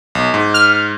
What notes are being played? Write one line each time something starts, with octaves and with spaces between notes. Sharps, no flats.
B1
G#2
F6